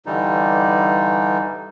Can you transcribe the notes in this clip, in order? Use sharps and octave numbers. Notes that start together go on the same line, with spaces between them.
G2 D3 E3 G3 D#4